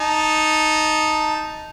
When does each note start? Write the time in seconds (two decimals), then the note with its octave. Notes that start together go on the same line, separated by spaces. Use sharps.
0.01 D#4 A5